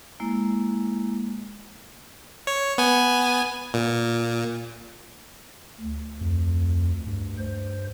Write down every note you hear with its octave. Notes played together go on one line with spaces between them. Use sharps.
G#3 A#3 E4
C#5
B3 G#5
A#2
D2
F2
G2
C5